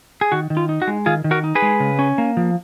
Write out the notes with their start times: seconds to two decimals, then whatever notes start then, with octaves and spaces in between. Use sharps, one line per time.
0.21 G#4
0.32 D#3 F#4
0.50 D#3
0.57 F4
0.69 D#4
0.82 F#4
0.87 G#3
1.06 D#3 F4 G#4
1.24 D#3
1.31 F#4 A#4
1.44 D#4
1.55 G#4 B4
1.62 G#3
1.80 C#3
1.99 C#4
2.18 A#3
2.37 F3